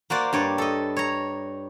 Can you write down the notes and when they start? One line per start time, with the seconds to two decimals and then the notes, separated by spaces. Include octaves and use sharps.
0.10 A#3 F#4 C5 D5
0.33 G2 C#5 D5
0.58 A4 D#5
0.96 C#5 A#5